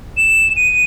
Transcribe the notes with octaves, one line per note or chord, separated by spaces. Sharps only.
E7
D#7